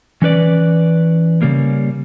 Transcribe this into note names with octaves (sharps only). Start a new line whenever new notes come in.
E3 C#4 B4 D5
C#3 G3 A#3